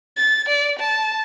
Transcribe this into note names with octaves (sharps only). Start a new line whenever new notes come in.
A6
D5
A5